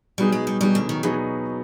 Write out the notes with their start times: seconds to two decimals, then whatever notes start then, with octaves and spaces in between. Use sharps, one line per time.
0.18 B2 F#3 G3 B3 D#4 G#4
0.32 G#3
0.47 G3
0.61 B2 F#3 G3 B3 D#4 G#4
0.75 D3
0.89 D#3
1.03 B2 E3 F#3 B3 D#4 G#4